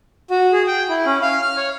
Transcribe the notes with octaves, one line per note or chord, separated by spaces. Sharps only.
F#4
G#4
G5
E4
C#4
F5
F6
C#5